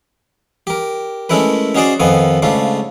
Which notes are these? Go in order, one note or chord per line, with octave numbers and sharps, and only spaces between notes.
G4 A#4
G#3 A3 C#4 E4 A#4 B4
C#4 D#4 F#4 G#4 C5 D5
F2 D#3 F3 B3 F4 G#5
G#2 C#3 A3 D4 F4